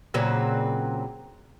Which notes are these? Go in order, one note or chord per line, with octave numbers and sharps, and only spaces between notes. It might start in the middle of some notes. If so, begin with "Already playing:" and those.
A#2 C#3 F#3 C4